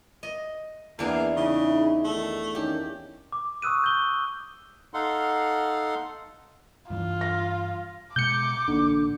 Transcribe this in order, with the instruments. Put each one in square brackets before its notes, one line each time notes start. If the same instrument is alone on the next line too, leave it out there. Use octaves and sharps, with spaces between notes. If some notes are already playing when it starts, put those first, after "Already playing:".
[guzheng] D#5
[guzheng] E2 D4 G#4 [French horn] E3 [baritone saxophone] A#3
[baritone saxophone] C#3 [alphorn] D#4 [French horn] E4
[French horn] D#3 [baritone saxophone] A3
[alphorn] D#3 [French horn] C#4 [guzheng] G4
[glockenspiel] D6
C#6 D#6 E6 F#6 D#7
G6 G7
[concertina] D#4 A4 F5 F#5 C6
[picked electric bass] G2 E3 [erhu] F4
[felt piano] A#6
[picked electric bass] B2 G#3 [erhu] D6 [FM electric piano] G6 C#7
[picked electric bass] A1 A#3 [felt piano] D3